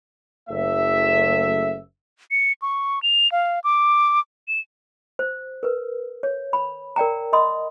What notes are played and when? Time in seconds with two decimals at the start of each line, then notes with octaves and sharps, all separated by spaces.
0.50 F#1 A3 E5
2.31 C#7
2.62 C#6
3.03 F7
3.32 F5
3.64 D6
4.48 E7
5.19 C5
5.63 A#4 B4
6.23 C#5
6.53 B5
6.96 A#4 D5 G5 A#5
7.33 D#5 B5 C6 D#6